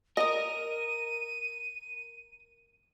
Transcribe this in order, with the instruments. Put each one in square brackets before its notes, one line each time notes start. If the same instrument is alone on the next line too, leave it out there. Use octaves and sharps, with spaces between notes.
[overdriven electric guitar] A#4 [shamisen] D#5 [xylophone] D#6 A#6 [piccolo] D#7